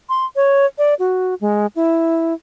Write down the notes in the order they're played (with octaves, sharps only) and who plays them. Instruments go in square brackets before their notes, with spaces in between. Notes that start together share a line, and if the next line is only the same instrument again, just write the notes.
[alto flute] C6
C#5
D5
F#4
G#3
E4